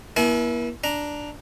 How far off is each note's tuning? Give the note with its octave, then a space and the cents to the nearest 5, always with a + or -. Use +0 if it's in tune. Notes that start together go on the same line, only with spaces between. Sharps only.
A#3 +45 E4 +0 G#5 +45
D4 +0 A#5 +5